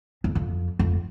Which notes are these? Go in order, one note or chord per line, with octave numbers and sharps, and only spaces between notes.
E2
F2
F2